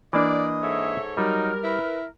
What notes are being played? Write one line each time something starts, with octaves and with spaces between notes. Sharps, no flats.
E3 A#3 D4 D5 D#5
G#2 A4 C#5 E5
F#3 G3 D#4 A#4
E4 B4